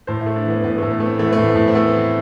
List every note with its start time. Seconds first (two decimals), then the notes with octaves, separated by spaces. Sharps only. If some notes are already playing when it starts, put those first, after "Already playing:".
0.07 A2 C5
0.21 E4
0.26 A3
0.36 D4
0.44 E3
0.50 B3
0.64 A2 B3
0.78 A2 A3
0.91 B3
1.00 A3
1.06 C4
1.19 E3 A3
1.26 B3
1.33 A3
1.38 A2
1.47 B3
1.56 A2
1.68 C4
1.74 A3 B3
1.94 E3